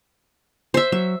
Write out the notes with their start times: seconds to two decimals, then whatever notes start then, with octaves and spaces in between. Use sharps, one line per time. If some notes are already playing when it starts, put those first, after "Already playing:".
0.74 C5 E5
0.92 F#3 E5